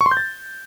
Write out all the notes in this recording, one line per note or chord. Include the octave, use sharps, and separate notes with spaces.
C#6
C6
G6
A6